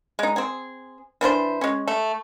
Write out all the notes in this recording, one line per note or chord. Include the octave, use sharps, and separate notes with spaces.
G#3 D#4
C4 G#4
E3 D4 A#4 C5
G#3 C#4
A3